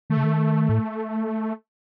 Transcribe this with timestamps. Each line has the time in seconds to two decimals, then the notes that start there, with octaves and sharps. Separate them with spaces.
0.10 D#3 A3
0.17 C#3
0.24 D#3
0.69 A2